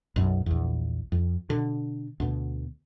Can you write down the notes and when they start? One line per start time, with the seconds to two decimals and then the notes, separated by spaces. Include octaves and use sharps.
0.16 B1 F#2
0.46 A#1 E2
1.12 F2
1.50 B2 D3
2.20 D2 B2